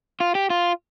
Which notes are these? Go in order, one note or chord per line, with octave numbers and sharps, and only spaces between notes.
F4
G4
F4